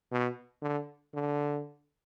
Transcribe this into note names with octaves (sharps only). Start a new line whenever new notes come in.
B2
D3
D3